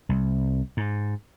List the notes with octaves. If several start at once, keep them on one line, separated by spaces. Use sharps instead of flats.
C2
G#2